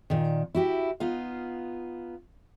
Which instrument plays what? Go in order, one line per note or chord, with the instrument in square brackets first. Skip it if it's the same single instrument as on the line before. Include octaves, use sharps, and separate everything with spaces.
[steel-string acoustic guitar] A#2 D#3
E4 F#4 G4
B3 D#4 F4 F5